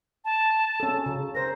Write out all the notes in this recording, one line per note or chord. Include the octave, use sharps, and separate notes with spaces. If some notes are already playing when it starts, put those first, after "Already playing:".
A5
C#4 A4
C#3
A#4 C5 A#6